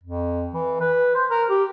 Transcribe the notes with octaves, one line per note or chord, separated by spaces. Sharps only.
F2
E3
B4
C5
A#4
G4